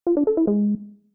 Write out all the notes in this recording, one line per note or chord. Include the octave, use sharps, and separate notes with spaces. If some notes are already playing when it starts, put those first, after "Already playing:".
F4
D4
A4
E4
G#3